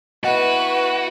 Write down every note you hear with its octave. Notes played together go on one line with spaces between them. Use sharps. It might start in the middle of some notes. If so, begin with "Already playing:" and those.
B3 E4 F#4 B4 D#5 F5 F#5
C#6